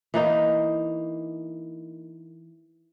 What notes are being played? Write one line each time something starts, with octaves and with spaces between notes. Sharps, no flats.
E3 A#3 D#4